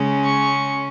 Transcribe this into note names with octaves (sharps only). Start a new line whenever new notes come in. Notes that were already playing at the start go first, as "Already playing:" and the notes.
Already playing: C#3 G#3 C#4
C#6